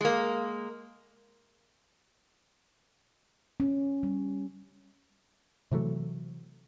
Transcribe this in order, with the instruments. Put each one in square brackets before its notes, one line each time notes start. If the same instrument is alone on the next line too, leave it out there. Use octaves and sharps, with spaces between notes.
[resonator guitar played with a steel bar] G#3 A#3
[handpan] C#4
G3
[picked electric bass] C3 E3 F#3 A3